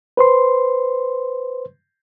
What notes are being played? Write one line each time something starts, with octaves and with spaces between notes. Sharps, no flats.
B4 C5 C6